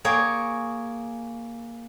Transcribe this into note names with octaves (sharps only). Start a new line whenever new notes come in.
A#3 G#4 C#5 G5